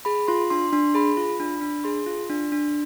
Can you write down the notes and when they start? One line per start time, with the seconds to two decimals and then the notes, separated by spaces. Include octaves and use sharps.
0.05 G#4 B5
0.28 F4 C6
0.50 D4 C6
0.73 D4 C6
0.95 G#4 B5
1.17 F4
1.40 D4
1.62 D4
1.84 G#4 C6
2.06 F4
2.30 D4
2.52 D4